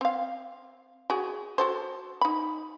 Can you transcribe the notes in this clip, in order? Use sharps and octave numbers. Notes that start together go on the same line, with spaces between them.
C4 F5
F#4 G#4
F#4 A4 C5
D#4 B5